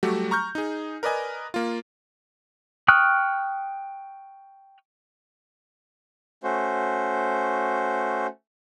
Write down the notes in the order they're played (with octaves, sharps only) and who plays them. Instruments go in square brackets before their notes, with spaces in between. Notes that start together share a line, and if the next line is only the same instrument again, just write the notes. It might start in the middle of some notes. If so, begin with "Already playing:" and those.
[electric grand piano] F#3 G3 A3 F#4 G4
A#5 C#6 F6 G6
D#4 G#4
A#4 B4 D5 D#5 G#5
A#3 F4
[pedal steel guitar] G5 C#6 D#6 F6 F#6
[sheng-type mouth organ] A3 C#4 F#4 C5